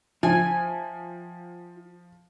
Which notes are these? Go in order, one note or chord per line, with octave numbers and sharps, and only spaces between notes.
F3 F4 E5 G5 G#5